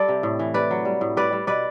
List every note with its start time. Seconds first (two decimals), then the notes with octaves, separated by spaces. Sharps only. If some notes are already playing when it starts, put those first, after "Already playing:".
Already playing: G3 A4 D5
0.08 C3
0.23 A2
0.39 E3
0.54 C3 B4 D5
0.71 F#3
0.85 G3
1.01 A2
1.17 G3 B4 D5
1.33 G3
1.47 B2 B4 D5